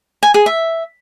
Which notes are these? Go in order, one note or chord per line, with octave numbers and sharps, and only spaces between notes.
G#5
G#4
E5